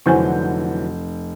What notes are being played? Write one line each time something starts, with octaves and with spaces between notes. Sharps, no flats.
F1 D3 E3 F#3 E4 C5 G#5 G6